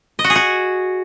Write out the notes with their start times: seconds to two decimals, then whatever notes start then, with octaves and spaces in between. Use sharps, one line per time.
0.19 D#5
0.24 F#4
0.30 G#4
0.36 F#4